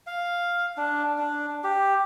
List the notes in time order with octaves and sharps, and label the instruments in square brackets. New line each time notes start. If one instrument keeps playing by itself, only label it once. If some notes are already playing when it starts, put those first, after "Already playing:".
[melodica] F5
D4
D4
G4